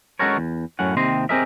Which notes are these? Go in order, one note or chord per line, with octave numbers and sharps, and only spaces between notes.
G#3 C#4 F#4 A4 A#4 C#5
E2
F#2 A2 C#4 F#5
D#2 C3 C4 D#5 C6
C4 G4 G#4 A#4 D#5 E5